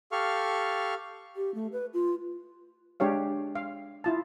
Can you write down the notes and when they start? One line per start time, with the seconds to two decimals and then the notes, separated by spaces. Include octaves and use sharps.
0.12 G4 A4 F5 C#6 F6
1.36 G4
1.55 A3
1.72 B4
1.94 F4
3.00 G#3 D4 G4 C#5 F5
3.55 F5
4.04 E4 F4 A5